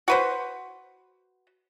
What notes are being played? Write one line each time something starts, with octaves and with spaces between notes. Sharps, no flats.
F#4 B4 C5